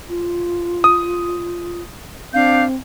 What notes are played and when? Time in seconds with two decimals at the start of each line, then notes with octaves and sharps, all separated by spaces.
0.09 F4
0.84 D#6
2.33 C4 D4 F5 G6